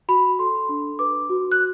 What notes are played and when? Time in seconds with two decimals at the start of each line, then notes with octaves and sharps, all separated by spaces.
0.09 F#4 B5
0.39 A4 C6
0.69 D4
0.99 B4 D6
1.30 F#4
1.52 F#6